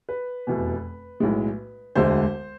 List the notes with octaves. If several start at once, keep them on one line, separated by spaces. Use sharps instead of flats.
B4
F1 E2 B2
B1 A2 G#3
E1 D2 D3 G#3 C5